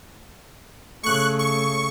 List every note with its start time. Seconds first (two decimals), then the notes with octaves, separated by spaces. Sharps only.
1.03 C#3 A3 C#6 F#6
1.39 C#6